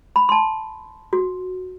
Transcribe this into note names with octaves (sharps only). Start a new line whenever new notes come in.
B5
A5 C6
F#4